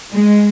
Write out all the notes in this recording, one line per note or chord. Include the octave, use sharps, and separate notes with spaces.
G#3